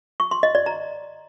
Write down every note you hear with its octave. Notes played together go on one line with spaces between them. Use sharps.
C#6
C6
D#5
D5
A#5